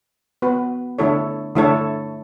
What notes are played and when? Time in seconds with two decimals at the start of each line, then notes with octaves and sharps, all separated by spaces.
0.42 B3 F#4 B4
0.98 D3 A3 E4 A4 C#5
1.55 D3 A3 E4 A4 C#5